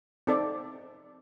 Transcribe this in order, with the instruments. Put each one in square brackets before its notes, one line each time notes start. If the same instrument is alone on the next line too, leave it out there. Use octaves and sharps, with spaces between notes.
[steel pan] C4 D#4 A4 D5